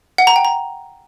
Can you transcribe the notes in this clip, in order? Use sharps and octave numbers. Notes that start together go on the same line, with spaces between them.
F#5
A#5
G5
A#5